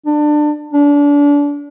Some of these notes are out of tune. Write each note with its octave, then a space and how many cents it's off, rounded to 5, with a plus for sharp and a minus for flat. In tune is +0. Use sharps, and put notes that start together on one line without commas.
D4 +25
D4 -30